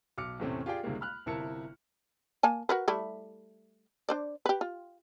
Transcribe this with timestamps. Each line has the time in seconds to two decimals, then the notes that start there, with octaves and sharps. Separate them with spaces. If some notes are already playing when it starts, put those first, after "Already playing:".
0.18 B1 D6 F6 C#7
0.40 E2 A2 C3 A3 C4 C#4
0.66 F4 G4 G#4 D5 G5
0.83 C#2 C3 D#3 G3 G#3 A#3
1.01 B5 F6 F#6
1.26 G1 C3 E4 A#4 A5 C#7
2.43 A#3 G#5 A5
2.69 F#4 A#4 B4
2.88 G3 A3 E4
4.09 D4 C5 D5
4.46 G4 B4
4.61 F4